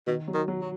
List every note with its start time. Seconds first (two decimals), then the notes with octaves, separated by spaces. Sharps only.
0.07 B2 D#3
0.28 F#3
0.34 D#3
0.48 F#3
0.61 F#3